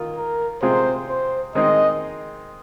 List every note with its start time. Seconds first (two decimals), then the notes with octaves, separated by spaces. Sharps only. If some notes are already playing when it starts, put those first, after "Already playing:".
Already playing: D#3 A#3 F4
0.16 A#4
0.62 C3 G#3 C4 F4 G#4 C5
1.09 C5
1.55 D#3 G#3 C4 D#4 G#4 D#5